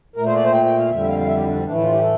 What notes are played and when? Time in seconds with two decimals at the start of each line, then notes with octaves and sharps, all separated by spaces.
0.16 A#2 A3 A#4
0.26 C5
0.36 D5
0.44 C5
0.53 G5
0.65 G5
0.78 F5
0.90 F2 D3 G3 E5
1.08 F5
1.19 F5
1.27 E5
1.37 G4
1.42 E4
1.47 D4
1.55 C4
1.64 A2 E3 A3 D4
1.74 E4
1.83 F4
1.92 G4
2.01 A4